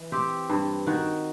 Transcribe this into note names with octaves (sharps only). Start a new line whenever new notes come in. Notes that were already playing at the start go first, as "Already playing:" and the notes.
Already playing: E3
C4 G4
G2
D#3 F#4